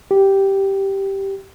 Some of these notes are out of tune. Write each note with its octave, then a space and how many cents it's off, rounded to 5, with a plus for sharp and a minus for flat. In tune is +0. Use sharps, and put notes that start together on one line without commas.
G4 -5